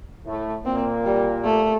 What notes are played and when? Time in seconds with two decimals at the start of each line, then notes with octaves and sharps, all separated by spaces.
0.26 A2 A3
0.66 A#2 A#3 C4
1.06 G3
1.45 A3